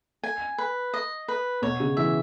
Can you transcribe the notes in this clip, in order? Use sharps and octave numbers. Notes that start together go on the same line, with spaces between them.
G#5
B4
D#5
B4
B2 C#5
C#3
E3 E5